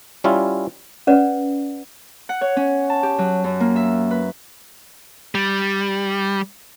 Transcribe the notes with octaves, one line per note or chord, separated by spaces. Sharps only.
G3 C#4 E4 F4
C#4 B4 D5 F#5
F#5
C#5
C#4
A5
G4
F#3
F#2
A#3
E5
B4
G3